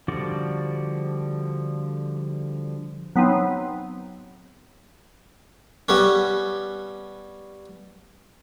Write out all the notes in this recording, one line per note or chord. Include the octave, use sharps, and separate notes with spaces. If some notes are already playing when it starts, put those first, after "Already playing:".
D3 F3 G3 F#4 D5
F#3 B3 C4 D#4
G3 B3 C#4